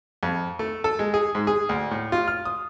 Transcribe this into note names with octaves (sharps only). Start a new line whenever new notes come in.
F2
A3
A4
G#3
G#4
G#2
G#4
D2
A2
F4
F6
D#6